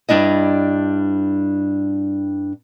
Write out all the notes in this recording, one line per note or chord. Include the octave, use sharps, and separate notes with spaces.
G2 G3 D4 E4 D#5